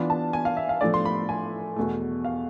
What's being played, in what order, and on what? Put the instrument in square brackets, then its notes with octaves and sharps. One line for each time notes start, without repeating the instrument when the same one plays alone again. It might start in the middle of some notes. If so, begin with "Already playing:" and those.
Already playing: [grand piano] E3 B3 D4 F4 [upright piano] B5
[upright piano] A5
G#5
F5
E5
F5
[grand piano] A2 F3 A3 D4 [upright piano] D5
[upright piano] C6
B5
G#5
[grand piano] E2 B2 A3
[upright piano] F5